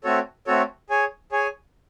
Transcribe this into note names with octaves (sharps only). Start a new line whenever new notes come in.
A3 C4 F#4 A4 C#5
A3 C4 F#4 A4 C#5
G#4 C#5 G#5
G#4 C#5 G#5